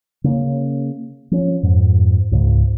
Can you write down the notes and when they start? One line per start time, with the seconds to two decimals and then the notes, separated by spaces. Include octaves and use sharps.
0.24 C#3 A#3 C#4
1.31 F3 C#4
1.63 F2 G#2
2.31 C#2 G#2 C#3